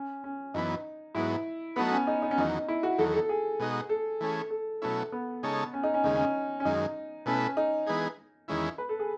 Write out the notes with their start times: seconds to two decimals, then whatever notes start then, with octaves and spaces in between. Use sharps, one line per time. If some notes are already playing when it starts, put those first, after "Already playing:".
Already playing: C#4
0.24 C#4
0.54 F#2 E3 B3 D#4
1.15 G#2 F#3 B3 E4
1.76 F#3 A3 B3 D#4 F#4 B4
1.92 C#4
2.07 D#4
2.22 D#4
2.31 C#4
2.37 E2 D#3 F#3 D#4
2.68 E4
2.83 F#4
2.98 E2 D#3 F#3 A4
3.14 A4
3.29 G#4
3.60 B2 G#3 D#4 F#4
3.89 A4
4.21 E3 A3 C#4 G#4
4.50 A4
4.82 B2 F#3 A3 C#4 E4
5.12 B3
5.43 C#3 G#3 D#4 A4 C#5
5.73 C#4
5.83 D#4
5.94 C#4
6.04 D#2 C#3 G#3 D#4
6.15 C#4
6.60 C#4
6.65 F#2 D#3 G#3 D#4
7.26 B2 A3 C#4 E4 B4
7.57 D#4
7.87 E3 G#3 B3 D#4 G#4
8.48 E2 D#3 G#3 C#4 E4
8.78 B4
8.89 A4
8.99 G#4